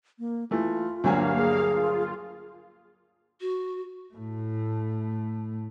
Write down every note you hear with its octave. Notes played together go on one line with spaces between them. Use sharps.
A#3
E3 A3 F4
D2 G2 F#3 A#3 F5 G#5
G#4
F4
F#4
A2 A3